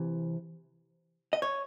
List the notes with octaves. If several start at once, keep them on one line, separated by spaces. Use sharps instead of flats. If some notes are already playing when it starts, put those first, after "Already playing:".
Already playing: C3 E3
D#5
C#5